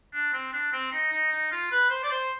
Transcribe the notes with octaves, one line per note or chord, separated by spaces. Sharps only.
D4
C4
D4
C4
D#4
D#4
D#4
F4
B4
C5
D5
C5